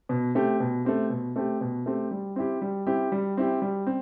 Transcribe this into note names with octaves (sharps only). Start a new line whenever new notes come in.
B2
A3 C4 G4
B2
A3 C4 G4
B2
A3 C4 G4
B2
A3 C4 G4
G3
C4 E4 G4
G3
C4 E4 G4
G3
C4 E4 G4
G3
C4